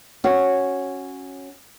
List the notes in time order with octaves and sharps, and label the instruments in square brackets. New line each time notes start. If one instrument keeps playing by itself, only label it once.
[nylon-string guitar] C#4 F#4